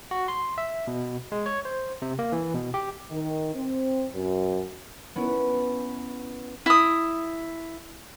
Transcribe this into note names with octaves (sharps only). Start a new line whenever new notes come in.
F#4
C6
E5
B2
G#3
C#5
C5
C3
A#3
E3
B2
G4
D#3
C4
F#2
B3 C#4 E4
E4 D#6